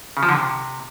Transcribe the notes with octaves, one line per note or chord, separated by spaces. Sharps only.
C#3
F3
D3
C3